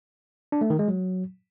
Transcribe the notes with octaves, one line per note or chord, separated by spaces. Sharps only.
D4
A3
D#3
G#3
F#3